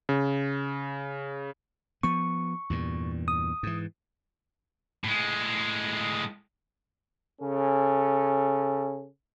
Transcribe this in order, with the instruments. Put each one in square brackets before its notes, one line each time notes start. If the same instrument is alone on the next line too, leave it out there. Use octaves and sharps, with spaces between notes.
[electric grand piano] C#3
[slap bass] F3 B3 [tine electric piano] C#6
[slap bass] E2 G2 A#2
[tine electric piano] D#6
[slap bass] G#2 E3
[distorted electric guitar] A2 G#3
[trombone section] C#3 C#4 A4